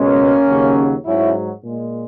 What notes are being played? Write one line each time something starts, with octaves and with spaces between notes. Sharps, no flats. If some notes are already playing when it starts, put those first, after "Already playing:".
Already playing: C#2 B2 G#3 A#3 C#4
D#2 C#3 F#3
G#2 F#3 C#4 E4
A#2 G#3